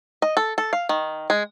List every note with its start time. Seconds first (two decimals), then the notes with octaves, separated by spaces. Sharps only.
0.22 D#5
0.37 A4
0.58 A4
0.73 F5
0.89 D#3
1.30 G#3